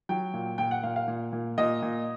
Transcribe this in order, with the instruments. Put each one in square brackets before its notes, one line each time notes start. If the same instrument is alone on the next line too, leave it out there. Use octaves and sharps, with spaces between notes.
[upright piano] F#3 G5
A#2
A#2 G5
F#5
A#2 F5
F5
A#2
A#2
A#2 D#5
A#2